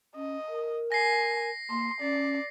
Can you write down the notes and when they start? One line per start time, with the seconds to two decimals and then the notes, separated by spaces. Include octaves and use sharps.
0.16 C#4 D#5
0.49 A#4
0.92 G#5 A#6 C7
1.70 A#3 C6
2.01 C#4 D5